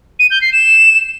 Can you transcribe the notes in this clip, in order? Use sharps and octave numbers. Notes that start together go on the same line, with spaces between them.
D#7
G6
C7
E7